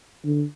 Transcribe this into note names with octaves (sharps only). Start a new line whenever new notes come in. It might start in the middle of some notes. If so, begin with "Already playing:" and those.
D3